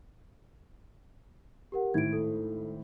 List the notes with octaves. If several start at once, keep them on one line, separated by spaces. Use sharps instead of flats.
G4 A#4 F#5
G#1 A2 G#6 D7
A4